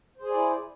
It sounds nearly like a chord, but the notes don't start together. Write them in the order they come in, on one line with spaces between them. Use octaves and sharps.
C5 G#4 G#5 D5 E4